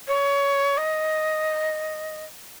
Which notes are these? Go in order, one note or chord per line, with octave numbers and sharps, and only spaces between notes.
C#5
D#5